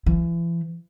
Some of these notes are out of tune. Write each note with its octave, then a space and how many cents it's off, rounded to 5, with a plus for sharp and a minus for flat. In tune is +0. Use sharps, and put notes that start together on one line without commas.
E3 +40